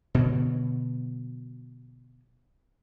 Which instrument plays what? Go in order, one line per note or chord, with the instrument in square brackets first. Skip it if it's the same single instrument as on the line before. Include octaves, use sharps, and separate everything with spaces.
[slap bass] B2 D3 F#3